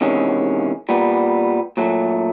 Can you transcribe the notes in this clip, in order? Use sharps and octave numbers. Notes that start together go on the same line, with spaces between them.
E2 C3 D#3 G#3 C#4
A#2 G3 B3
A#2 F#3 A3